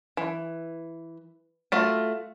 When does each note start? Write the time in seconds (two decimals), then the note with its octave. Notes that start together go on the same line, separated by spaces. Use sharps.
0.17 E3
1.72 A3 F4 F#4